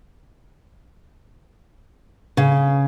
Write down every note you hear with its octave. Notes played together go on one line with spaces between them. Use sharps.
C#3